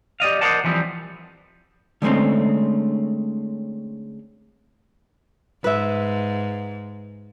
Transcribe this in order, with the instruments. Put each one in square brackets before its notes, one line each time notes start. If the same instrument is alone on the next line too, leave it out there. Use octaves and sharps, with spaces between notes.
[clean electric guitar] G4 D5 D#5 F5
A#4 C5 D5 D#5 F#5 A5
E3 F3 G3 C4
[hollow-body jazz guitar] D3 G#3 A3 C4 C#4
[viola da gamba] G#2 [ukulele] B4 E5